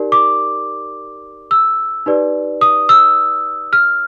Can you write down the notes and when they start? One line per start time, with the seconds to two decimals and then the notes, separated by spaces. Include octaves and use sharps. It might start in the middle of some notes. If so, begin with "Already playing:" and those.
Already playing: D#4 G4 A#4 D5
0.12 D6
1.51 E6
2.06 D#4 G4 B4 D5
2.61 D#6
2.89 E6
3.73 F6